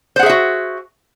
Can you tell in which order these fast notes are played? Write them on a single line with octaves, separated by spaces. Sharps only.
C5 F#5 G#4 E5 F#4